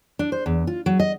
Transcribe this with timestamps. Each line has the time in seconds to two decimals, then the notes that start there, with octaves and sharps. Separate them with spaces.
0.19 D4
0.32 C5
0.46 E2
0.67 F4
0.86 F#3
1.00 D#5